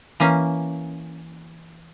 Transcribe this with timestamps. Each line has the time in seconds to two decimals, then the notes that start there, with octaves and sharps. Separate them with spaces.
0.20 E3 A#3 C#4